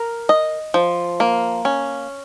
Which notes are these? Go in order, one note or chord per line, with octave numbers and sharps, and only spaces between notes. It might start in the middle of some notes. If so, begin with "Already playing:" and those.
Already playing: A#4
D#5
F3
A#3
C#4